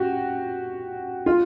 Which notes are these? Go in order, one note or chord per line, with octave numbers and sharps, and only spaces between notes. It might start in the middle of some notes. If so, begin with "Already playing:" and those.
Already playing: F#4 G4
F4